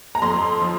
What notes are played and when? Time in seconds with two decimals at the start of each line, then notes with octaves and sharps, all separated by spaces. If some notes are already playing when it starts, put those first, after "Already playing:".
0.15 A#5
0.22 F2 C6
0.62 F3